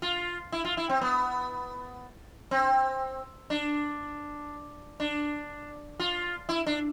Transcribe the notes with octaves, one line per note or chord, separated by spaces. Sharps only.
F4
E4
F4
E4
C4
B3
C4
D4
D4
F4
E4
D4